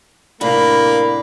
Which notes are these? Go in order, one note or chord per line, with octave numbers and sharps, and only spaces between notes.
A2 C3 A#3 D4 F5 B5